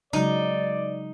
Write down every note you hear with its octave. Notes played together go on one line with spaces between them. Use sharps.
C#3 F#3 G#3 D#4 D5